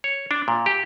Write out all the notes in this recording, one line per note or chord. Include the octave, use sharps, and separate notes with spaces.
C#5
D4
A#2
G4